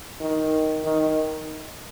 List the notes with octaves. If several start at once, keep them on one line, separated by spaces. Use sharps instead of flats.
D#3
D#3